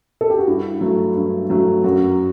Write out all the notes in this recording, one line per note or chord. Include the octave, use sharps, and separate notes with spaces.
A4
G4
F#4
G2 E4
F#3 A3
G2
F#3 A3
F#2 F#4